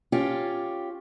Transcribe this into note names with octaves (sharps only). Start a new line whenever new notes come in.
C#4 F4 G4